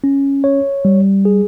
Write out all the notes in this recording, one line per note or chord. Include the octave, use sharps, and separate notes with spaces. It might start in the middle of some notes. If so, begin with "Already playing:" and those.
C#4
C#5
G3
G#4